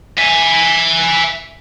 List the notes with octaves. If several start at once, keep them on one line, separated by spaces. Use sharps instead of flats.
E5 G#5